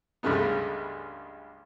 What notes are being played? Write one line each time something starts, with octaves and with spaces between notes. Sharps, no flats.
C#2 G2 C#3 G#3 A3 B3